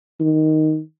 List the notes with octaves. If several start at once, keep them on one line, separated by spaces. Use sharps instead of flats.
D#3